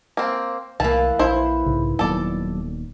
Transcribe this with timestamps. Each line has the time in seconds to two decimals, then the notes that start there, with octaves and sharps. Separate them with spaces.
0.17 A#3 C4
0.80 C2 E3 A#3 A5
1.19 A#1 E4 C5
1.66 B1 G#2 C#3
1.99 D#1 D#2 F#3 B3 A4 D5